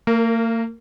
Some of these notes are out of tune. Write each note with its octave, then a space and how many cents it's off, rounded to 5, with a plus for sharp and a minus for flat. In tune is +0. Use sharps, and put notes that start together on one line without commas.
A#3 -40 A#4 -5